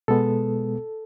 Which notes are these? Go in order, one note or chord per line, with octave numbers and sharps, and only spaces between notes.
B2 G#3 B3 A4